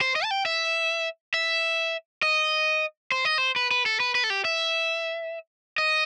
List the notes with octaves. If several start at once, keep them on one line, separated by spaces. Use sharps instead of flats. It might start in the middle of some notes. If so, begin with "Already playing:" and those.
C5
D#5
A5
G5
E5
E5
D#5
C5
D#5
C5
B4
B4
A4
B4
B4
A4
G4
E5
D#5